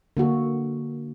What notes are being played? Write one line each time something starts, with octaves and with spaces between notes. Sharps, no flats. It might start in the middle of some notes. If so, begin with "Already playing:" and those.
D3 A#3 F#4 A4